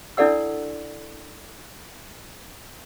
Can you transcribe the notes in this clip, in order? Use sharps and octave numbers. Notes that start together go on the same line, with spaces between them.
D4 E4 A4 D5 F#5 E6